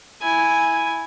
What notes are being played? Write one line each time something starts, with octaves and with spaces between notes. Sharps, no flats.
E4 G#5